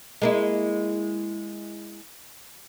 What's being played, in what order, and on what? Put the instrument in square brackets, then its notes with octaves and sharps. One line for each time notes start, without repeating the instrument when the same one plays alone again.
[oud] G#3 A#3 E4